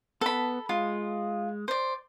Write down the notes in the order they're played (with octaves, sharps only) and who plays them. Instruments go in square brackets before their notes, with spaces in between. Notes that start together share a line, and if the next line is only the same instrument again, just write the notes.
[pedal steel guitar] B3 [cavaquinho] A4 B5
[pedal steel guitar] G#3 [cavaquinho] F4
[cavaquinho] C5 D5